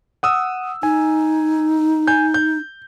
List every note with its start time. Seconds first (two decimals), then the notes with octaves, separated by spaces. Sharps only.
0.23 F#5 D#6 E6
0.83 D#4 G#5
2.07 G#5 G6
2.34 G6